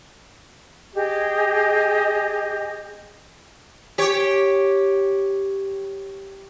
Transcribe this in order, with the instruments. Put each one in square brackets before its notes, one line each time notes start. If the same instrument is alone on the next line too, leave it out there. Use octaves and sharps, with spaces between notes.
[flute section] G4 G#4 D#5
[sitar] G4 C#5